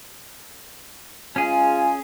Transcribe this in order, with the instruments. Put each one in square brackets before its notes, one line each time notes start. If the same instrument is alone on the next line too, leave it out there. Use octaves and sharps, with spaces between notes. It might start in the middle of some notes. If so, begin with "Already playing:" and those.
[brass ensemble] G#3 F4 G#5 [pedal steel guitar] C#4 G#4